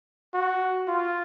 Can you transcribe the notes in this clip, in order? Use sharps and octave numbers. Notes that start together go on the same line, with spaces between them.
F#4
F4